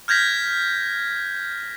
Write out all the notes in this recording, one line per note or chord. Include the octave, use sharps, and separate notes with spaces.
F6 G6 G#6 A#6 B6